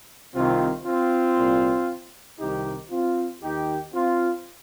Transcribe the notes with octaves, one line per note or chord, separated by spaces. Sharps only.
C2 C3 D#3 C4 F4
C4 F4
C2 A#2
C2 C3 D#3 D#4 G4
C4 F4
D#2 D#3 D#4 G4
C4 F4